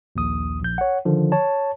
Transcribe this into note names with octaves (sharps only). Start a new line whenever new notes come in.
A#1 D#2 D#6
A#1 G6
C#5 F#5
D3 D#3 F3
C#5 A5